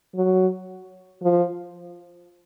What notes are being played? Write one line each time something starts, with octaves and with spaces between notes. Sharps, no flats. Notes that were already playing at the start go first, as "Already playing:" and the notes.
F#3
F3